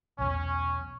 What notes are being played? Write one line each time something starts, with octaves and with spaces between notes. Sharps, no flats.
B1 E2 B2 C#4